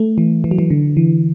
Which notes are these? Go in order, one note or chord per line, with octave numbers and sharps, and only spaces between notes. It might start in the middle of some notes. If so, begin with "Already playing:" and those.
Already playing: A3
E3
E3
F#3
E3
D3
E3